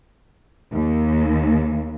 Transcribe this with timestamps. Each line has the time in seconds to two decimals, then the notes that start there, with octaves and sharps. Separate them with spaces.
0.72 D#2